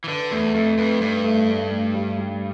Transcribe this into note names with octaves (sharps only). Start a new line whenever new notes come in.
E3
D3 B4
E2 A3
F2 A3
F2 B4
G2 B4
A3
A3
A3
G3
G3